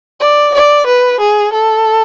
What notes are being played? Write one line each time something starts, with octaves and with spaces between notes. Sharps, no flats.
D5
D5
B4
G#4
A4